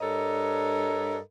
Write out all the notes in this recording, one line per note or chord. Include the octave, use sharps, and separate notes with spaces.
G2 D4 A4 A#4 C#5 D#5